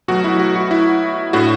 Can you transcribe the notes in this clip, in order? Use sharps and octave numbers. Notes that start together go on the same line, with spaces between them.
B2 F#3 A3 F#4
E4
F#4
F#4
E4
A2 A3 D4 F#4